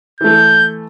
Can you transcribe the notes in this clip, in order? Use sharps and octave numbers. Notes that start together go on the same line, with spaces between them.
E3 A3 G6